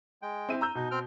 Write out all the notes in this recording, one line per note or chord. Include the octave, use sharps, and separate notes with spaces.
G#3 G5
C4 E4 D#7
A#5 E6 G6
B2 D#4
C4 G5 F6